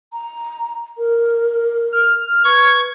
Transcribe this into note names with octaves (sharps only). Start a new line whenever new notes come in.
A#5
A#4
F6
B4 C#6 G#6